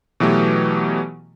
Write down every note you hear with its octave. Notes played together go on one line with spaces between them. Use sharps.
B2 E3 F#3 A3 G4